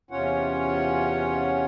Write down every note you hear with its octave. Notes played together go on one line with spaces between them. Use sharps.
E2 C3 C#4 F4 C#5 F#5